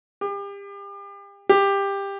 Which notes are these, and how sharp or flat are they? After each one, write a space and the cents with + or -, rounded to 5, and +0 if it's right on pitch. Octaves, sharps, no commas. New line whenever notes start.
G4 +35
G4 +15